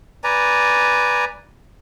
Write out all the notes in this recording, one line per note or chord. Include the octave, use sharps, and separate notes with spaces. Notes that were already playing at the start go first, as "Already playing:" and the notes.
B4 D5 G#5 A#5